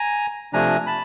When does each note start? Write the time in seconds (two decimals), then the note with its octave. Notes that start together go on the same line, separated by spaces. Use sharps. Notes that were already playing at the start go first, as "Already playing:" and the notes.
Already playing: G#5 A#5
0.53 C3 F3 A3 D4 G#5 A#5
0.87 A5 B5